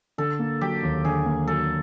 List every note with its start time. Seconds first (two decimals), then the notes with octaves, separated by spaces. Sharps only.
0.18 D3 A4
0.39 A#3
0.61 F#3 G4
0.83 D#2
1.04 D3 G#4
1.26 A#3
1.47 F#3 A4